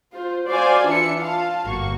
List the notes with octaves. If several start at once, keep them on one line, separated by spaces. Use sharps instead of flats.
F4 C5
F#4 C5 D5 F5 G#5
E3 D4 F4 E5 C#7
F4 F5 A5
G1 A#3 F#4 C#6